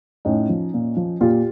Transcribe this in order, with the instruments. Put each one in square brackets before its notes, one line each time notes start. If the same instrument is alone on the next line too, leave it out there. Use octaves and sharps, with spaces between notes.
[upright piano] A2 C#4 D#4
F3
A#2
F3
A#2 F4 G4